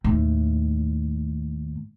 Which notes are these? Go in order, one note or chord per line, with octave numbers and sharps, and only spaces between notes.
D#2 A2